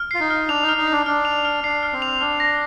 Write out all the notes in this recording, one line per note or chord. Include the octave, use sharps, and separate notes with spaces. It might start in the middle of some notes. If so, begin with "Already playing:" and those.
Already playing: F6
F4 C7
D#4
F6
D4 F7
D#4
F6
D#4
D4 C7
D4 F6
F7
F6
D4 C7
F6
C4
F7
D4 F6
A#6